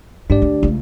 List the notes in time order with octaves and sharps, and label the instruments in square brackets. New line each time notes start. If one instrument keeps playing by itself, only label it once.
[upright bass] G#2 [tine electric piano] D4 G4 D5
[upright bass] D2
C#2 A3